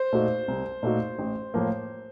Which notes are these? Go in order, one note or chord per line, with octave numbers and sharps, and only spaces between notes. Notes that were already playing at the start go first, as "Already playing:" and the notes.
Already playing: C5
A#2 A3 D#4 F#4
C2
A#2 A3 D#4 F#4
A1
A2 F3 A#3